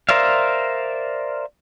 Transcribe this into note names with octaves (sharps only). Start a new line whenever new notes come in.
A#4 C5 D5 E5 F5